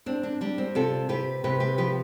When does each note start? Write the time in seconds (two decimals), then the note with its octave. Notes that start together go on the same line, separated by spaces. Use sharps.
0.06 C4 D4
0.23 D4
0.41 G3 D4
0.58 C4
0.75 C3 F4 A4
1.09 C3 G4 B4
1.44 C3 G4 B4
1.60 G4 B4
1.78 F3 G4 B4